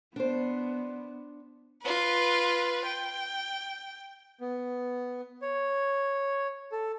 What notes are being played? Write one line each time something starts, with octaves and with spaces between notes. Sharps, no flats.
B3 D4 C5
F4 B4
G5
B3
C#5
A4